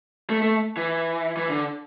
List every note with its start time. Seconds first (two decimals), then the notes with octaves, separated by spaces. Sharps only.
0.30 A3
0.42 A3
0.77 E3
1.37 E3
1.50 D3